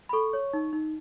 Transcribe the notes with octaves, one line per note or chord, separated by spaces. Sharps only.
B5
A4 C#6
C#5
D#4
D#4